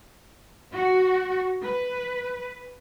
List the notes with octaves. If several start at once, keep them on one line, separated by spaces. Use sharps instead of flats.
F#4
B4